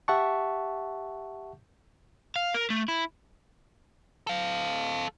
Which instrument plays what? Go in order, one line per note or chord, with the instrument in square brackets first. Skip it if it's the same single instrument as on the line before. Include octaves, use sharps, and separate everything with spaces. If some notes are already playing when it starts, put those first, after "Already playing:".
[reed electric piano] G4 E5 F#5 A5 C#6
[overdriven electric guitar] F5
A#4
A3
E4
[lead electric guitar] A4 F5